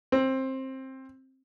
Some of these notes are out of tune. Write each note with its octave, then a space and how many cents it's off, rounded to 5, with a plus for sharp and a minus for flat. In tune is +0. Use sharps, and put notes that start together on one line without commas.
C4 +15